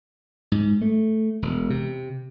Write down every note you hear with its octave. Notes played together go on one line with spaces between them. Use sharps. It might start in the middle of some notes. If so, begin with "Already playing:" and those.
G#2
A3
E1
C3